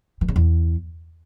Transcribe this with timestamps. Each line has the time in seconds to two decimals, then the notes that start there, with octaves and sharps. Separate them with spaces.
0.21 E3
0.28 C#3
0.36 E2